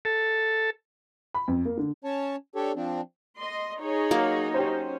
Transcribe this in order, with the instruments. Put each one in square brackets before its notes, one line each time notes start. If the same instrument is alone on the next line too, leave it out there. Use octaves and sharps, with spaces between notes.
[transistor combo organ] A4
[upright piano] B5
F2
A#3
D3
[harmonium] C#4 C#5 A5
D4 G4 A4 C#5
F3 C4 D4
[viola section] D#5 C6
[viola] D#4 [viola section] G#4 C#5
[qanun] F#3 A#3
[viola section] C#4 [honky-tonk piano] G4 C5